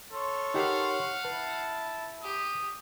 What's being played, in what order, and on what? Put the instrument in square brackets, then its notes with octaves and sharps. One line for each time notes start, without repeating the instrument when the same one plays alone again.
[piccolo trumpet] A4 [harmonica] C#5 C6 F6
[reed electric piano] D#4 G4 A#4 [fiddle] F5 F#5
[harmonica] E4 [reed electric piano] B4 [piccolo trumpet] A5
[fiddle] G4 [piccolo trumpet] D#6